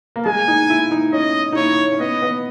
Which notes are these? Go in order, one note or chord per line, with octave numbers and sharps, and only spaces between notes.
A#3
G#3 G#5
D#4
E4
D#4
C#4 D#5
D#4
E4 C#5
C#4
B3 D#5
B3